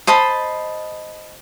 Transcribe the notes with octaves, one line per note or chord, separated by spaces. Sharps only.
C5 D#5 A5 B5